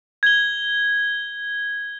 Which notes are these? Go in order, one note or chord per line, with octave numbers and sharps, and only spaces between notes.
G#6 G7